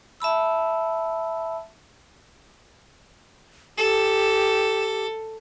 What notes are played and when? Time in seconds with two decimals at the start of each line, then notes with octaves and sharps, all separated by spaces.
0.20 E5 A5 B5 E6
3.78 G4 A4